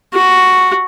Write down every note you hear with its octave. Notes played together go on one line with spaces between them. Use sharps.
F#4